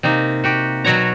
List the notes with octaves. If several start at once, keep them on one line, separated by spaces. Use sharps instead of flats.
C3 A#3 D#4
F#4 G4
B2 F#3 F#4 C#5 A#5